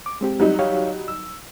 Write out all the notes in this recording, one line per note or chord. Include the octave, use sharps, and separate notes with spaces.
D6
G#3 C4 G4
F#3 G3 D#4
G4 C#5 F5
E6